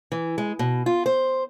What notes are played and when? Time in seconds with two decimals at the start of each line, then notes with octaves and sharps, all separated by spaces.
0.12 E3
0.38 G#3
0.59 B2
0.86 F4
1.06 C5